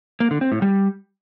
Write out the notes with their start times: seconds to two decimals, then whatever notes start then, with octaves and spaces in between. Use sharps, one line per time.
0.20 A#3
0.31 D3
0.41 C4
0.52 A2
0.62 G3